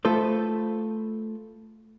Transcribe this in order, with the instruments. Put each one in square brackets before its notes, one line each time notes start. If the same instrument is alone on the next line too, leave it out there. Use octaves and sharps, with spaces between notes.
[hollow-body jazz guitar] A3 F4 A4 B4 C5